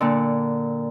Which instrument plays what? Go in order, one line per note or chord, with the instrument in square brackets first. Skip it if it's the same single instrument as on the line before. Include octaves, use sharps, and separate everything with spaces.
[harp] A#2 D3